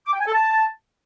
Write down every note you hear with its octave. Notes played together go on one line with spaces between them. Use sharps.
D6
G5
G#5
A4
A5